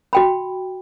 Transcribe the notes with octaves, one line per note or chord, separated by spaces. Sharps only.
F#4 G5 B5